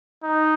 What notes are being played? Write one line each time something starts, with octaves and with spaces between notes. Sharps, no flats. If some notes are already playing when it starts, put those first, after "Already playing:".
D#4